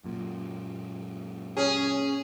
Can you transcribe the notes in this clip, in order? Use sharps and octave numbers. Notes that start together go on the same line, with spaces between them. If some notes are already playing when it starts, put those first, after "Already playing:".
F#2 A#2
C#4 G#4